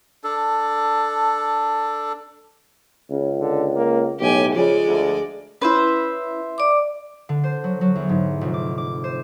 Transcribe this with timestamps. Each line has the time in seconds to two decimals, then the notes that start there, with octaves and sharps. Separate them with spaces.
0.24 D4 A4
3.10 C#2 C#3
3.40 D3
3.76 A#3
4.20 B1 A2 G4 G#5
4.55 C#3 F3 G#3 D5
4.86 D2
5.62 C#4 E4 B4 C5 E5
6.58 D5 D6
7.29 D3
7.44 C5
7.64 F#3
7.81 F#3
7.95 E2
8.09 G#2
8.41 F1
8.54 D6
8.78 D6
9.04 C5